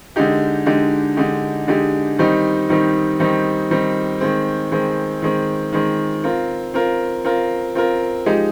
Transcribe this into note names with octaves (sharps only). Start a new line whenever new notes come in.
D3 G#3 D#4 G4
D3 G#3 D#4 G4
D3 G#3 D#4 G4
D3 G#3 D#4 G4
D#3 G3 C4 D#4
D#3 G3 C4 D#4
D#3 G3 C4 D#4
D#3 G3 C4 D#4
D#3 G#3 C4
D#3 G#3 C4
D#3 G#3 C4
D#3 G#3 C4
C4 F4 A#4
C4 F4 A#4
C4 F4 A#4
C4 F4 A#4
F3 G#3 D#4 G4